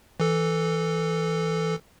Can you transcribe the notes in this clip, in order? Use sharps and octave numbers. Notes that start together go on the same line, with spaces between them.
E3 A4